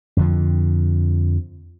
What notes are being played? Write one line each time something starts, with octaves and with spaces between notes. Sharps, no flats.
F2 D3 F3